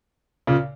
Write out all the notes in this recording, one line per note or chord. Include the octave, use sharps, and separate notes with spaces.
A#2 C#3